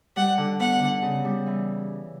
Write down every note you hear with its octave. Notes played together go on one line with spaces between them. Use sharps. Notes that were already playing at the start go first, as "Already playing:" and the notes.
G3 F#5
D3
B3 F#5
D3
C#3
G3
E3